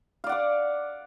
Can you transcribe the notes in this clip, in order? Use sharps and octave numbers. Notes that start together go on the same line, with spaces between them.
D5 F5 F#5 D6